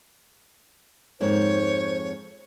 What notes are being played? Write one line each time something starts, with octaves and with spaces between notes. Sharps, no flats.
F2 G#2 A#3 C5 C#5